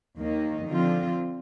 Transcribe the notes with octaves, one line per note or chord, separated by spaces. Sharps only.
D#2 D#3 A#3 D#4
D3 F3 C4 F4